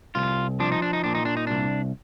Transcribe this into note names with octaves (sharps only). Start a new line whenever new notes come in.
C2 F4
F3 D4
D#4
D4
D#4
A#2 D4
D#4
D4
D#4
C2 D4